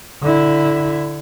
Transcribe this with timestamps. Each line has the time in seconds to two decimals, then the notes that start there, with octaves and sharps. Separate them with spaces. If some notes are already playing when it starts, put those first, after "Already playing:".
0.22 D3 E4